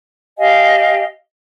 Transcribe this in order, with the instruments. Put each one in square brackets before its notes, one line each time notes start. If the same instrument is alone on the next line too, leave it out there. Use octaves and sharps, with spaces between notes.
[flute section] G4 D#5 F5 G#5